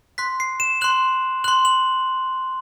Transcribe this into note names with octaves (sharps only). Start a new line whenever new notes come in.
C6 F#6 B6
C7
E7
C6 F#6 F#7
C6 F#6 F#7
F#7